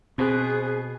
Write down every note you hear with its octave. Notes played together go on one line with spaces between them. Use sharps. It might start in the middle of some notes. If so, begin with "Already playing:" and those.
B2 C4 G#4 C5 F#6